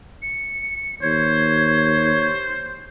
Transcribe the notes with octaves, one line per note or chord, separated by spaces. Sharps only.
C#7
D#2 C5 C#5 G#6